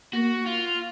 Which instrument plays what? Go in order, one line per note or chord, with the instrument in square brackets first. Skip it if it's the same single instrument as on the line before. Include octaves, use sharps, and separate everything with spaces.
[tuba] A#3 [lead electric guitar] F#4
[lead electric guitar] F4